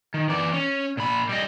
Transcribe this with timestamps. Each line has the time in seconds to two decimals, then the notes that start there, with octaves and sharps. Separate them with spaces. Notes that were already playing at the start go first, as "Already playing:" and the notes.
0.14 D#3
0.29 E3 D5
0.54 C#4
0.97 A#2 B5
1.29 G3 D#5